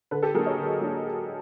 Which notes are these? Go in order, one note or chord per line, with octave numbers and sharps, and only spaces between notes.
D3 A4 B4
G4 A4
F#3 A#3 D4 G#4 A#4
C#5 D#5
D3
F#3 A#3 D4